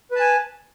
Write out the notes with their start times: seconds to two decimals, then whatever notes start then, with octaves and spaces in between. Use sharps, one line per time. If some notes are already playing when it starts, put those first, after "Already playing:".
0.11 B4
0.15 A5
0.20 G#5